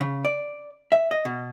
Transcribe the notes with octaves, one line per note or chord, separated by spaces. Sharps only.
C#3
D5
E5
D#5
B2